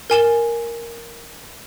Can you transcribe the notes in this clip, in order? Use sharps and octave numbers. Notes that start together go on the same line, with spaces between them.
A#4 G#5 E7 G7